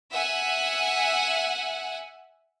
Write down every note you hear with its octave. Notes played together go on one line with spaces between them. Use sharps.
E5 F#5 G#5